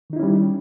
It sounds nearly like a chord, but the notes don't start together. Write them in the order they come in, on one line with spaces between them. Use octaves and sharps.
D#3 D#4 E4 C#4 G3